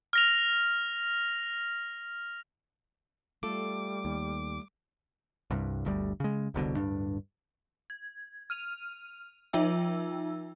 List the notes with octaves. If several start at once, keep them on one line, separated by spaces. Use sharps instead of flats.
F6 A#6 F7
G3 A3 F4 A4 D6
D#2
C2 G2
G1 D2 G3
C#3 G#3
E1 C2 B2 D3
D1 G2 D4
G#6
F6 D#7 F7
F3 D#4 F4 E5 G5 E6